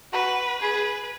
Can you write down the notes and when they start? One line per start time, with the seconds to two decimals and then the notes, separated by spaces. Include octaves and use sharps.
0.13 F#4 B4
0.62 G#4 B4